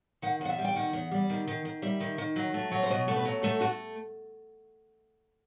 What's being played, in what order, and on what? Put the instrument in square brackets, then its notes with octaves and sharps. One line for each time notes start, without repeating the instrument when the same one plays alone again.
[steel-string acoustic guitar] D#3 F#5
E2 F#5
E5
G3
G5
D#3 F#5
E2
G3
D#3
D#3
D#3
G3 E5
D#3
D#3
F#3
A3
F#3
C5
B2 D#5
A3
B4
F#3
A3 A4
A3 F#4